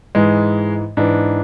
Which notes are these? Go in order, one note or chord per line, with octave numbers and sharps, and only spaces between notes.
G#2 E3 G#3
G#2 E3 D4